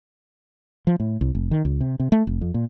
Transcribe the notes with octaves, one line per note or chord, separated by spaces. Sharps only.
F3
A2
C2
F1
D#3
C#2
C3
C3
A3
F1
F2
A#2